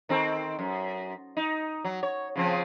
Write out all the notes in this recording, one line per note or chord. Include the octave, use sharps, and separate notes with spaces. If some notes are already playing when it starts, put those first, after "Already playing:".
D#3 C4 A4
F#2
D#4
F#3
C#5
C#3 F3 C4